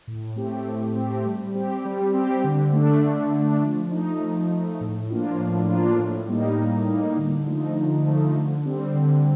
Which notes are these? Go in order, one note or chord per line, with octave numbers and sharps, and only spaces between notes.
A2
A3 C4 G4
A2
A3 C4 G4
G3
C4 G4
G3
C4 G4
D3
A3 D4
D3
A3 D4
F3
A3 D#4
F3
A3 D#4
A2
F3 A#3 D4 F4
A2
F3 A#3 D4 F4
A2
G3 A#3 D#4
A2
G3 A#3 D#4
D3
F3 A3 D#4
D3
F3 A3 D#4
D3
G3 C4
D3